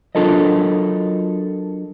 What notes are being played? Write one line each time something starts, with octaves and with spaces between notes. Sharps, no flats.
F#3 D4 F4 A4 A#4 D#5